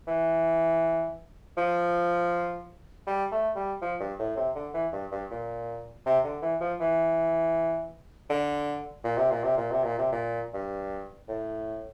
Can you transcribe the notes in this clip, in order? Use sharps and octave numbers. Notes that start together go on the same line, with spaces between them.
E3
F3
G3
A3
G3
F3
G2
A2
C3
D3
E3
G2
G2
A#2
C3
D3
E3
F3
E3
D3
A#2
C3
A#2
C3
A#2
C3
A#2
C3
A#2
G2
A2